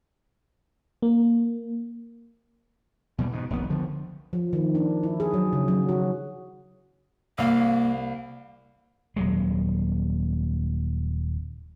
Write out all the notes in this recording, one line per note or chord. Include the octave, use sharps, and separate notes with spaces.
A#3
B2 E3 G3
G#2 B2
F1 C2 D#3 B3
D3 F3
F3
D#3
D4
E4
G#4
F#3
C#3
F#3
F#4
C2 A#3 F5
D#1 F#3 G#3